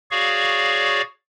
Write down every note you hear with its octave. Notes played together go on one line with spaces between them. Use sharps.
F#4 G#4 C#5 D5 F5 C#6